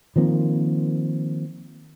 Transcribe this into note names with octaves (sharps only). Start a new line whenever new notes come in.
D#3 F3 A#3 C4